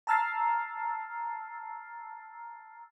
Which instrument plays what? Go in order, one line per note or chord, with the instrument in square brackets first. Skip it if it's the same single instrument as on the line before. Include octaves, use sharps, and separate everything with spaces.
[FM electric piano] A5 A#5 E6 F6 A6 C7